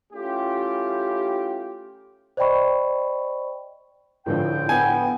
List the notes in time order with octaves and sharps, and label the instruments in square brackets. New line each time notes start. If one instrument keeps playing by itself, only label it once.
[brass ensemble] A3 C#4 E4 F4 G4
[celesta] C5 D5 D#5 G5 B5 C#6
[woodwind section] C#2 G5 [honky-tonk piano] A2 D3 F3
[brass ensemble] B3 [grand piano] G#5